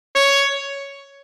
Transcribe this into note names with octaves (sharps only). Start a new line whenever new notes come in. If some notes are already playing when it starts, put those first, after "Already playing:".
C#5